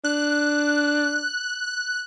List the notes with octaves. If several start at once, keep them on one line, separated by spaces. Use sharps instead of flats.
D4 F#6